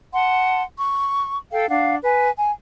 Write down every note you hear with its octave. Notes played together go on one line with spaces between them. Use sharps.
F#5 A5 C6
C#6
A4 F5 G5
D4 F5 F#5
B4 G#5
G#5